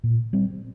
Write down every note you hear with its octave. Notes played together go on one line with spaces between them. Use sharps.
A#2
G3 C4